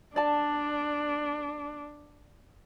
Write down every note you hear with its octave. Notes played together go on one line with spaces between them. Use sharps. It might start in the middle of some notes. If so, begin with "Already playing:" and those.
D4 D5 A5